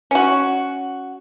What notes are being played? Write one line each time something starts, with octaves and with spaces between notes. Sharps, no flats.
C#4 F#4